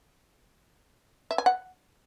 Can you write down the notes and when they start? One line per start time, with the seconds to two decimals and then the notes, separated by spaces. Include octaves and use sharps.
1.31 E5
1.38 G#5
1.46 F#5